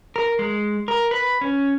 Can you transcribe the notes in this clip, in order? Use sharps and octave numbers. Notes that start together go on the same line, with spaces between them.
A#4
G#3
A#4
B4
C#4